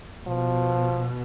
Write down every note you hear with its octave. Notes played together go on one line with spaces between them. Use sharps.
B2 F3